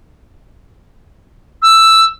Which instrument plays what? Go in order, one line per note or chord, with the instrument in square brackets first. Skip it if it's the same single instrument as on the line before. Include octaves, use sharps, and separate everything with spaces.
[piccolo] E6